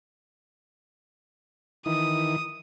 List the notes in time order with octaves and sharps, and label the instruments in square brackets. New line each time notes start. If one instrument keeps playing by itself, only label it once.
[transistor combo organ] D#3 E3 [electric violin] D#6